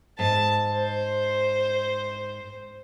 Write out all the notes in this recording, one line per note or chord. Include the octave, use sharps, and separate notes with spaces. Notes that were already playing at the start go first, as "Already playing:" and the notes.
G#2 A5
C5